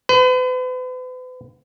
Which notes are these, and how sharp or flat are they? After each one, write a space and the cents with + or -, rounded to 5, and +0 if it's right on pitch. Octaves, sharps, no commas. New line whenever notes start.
B4 +40